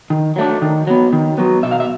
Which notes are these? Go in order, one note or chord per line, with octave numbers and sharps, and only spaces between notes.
D#3
F#3 A3 D4
D#3
F#3 B3
D#3
F#3 B3
B2 E5
F5
E5